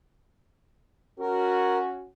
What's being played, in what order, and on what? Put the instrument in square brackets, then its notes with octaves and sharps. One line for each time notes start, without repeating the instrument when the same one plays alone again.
[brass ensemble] C#4 F#4 [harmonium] A#4